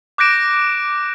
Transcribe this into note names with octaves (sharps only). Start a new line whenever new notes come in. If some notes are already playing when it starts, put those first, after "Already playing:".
D6 F#6 G6 A#6 D7 E7